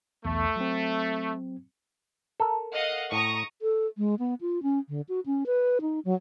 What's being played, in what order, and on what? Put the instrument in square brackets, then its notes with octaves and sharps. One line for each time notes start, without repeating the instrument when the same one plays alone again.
[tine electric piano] B1 E2 [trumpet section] A3
[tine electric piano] F#3 C4
[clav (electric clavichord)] A4 A#4
[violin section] D#5 F5 F#5
[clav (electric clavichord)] A2 [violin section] A#5 C#6 D#6
[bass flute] A4
G#3
B3
F4
C#4
D3
F#4
C#4
B4
D#4
F#3